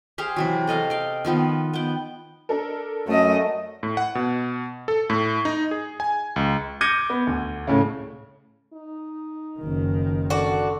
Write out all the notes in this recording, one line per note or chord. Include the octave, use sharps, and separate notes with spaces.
G4 G#4 C5 F5
C3 E3 F#3
A4 D#5 F5 A#5
F5 G5
D#3 F3 B3 D#4
B3 G5
D4 A4 A#4
F#2 A3 D#5
A2
F#5
B2
A4
A2
D#4
G#4
G#5
C#2
D6 G6 G#6 A#6 C#7 D#7
B3
D2
A2 C#3
D#4
F#1 D#3
D3 F#4 D5